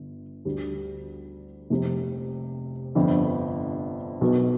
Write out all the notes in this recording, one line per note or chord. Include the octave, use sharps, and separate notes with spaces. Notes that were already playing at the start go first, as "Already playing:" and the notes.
Already playing: G1
D2 D3 G3
F1 F2 C3
G1 F2 D3
B1 B2 B3